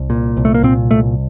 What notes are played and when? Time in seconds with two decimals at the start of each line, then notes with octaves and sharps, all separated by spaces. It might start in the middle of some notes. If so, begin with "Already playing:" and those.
Already playing: C2
0.10 A#2
0.37 C2
0.45 A3
0.54 A#3
0.63 A#2 C4
0.91 C2 A3